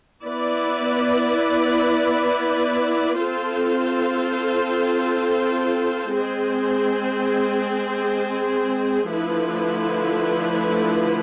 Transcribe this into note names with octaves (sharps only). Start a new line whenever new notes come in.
B3 E4 B4 D5
C4 F4 A4 C5
G#3 C4 G#4 C5
D3 F3 A3 E4 B4